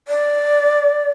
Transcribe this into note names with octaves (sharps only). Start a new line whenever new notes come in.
D5